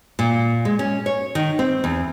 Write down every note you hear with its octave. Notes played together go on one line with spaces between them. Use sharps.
A#2
G#3
C#4
C#5
D#3
C4
E2